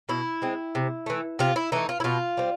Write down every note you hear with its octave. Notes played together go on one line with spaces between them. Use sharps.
B2 E4
G#3 C4
C3
E3 A3
C3 F4
E4
E3 A3 D#4
F4
E4
B2 F4
G3 C4